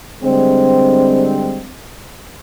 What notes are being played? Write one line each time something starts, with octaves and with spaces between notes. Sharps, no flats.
D3 G3 G#3 C4